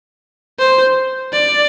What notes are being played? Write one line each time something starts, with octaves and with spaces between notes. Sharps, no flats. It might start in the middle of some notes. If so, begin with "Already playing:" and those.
C5
D5